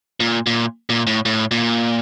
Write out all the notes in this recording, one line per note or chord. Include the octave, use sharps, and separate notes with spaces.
A#2
A#2
A#2
A2
A2
A#2